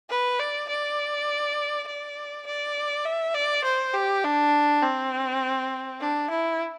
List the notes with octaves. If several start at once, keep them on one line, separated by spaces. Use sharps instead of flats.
B4
D5
D5
D5
D5
E5
D5
C5
G4
D4
C4
D4
E4